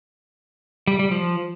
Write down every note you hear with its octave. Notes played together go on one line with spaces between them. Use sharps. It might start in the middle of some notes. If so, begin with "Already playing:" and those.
G3
G3
F3